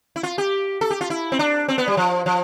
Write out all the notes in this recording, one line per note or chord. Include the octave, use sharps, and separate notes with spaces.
E4
F4
G4
A4
G4
F4
E4
C4
D4
C4
B3
G3
F3
F3